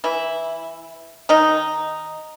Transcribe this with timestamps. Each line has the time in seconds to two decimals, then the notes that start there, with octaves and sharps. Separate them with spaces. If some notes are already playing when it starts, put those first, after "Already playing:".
0.04 E3 E4
1.29 D#3 D#4